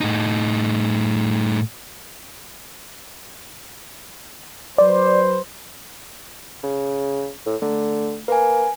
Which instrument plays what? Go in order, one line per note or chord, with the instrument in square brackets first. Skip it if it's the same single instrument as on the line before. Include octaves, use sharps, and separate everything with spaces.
[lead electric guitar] A2 D#4
[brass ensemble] F#3 B4 C5 [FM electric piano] D5
[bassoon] C#3
A2
[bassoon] D3 [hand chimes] A3
[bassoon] A#3 [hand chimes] B4 G#5